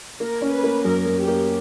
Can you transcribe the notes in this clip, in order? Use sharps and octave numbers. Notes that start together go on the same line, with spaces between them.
A#3 A#4
C#4
B4
A#3
F#2 A#4
F#2
G4
A#3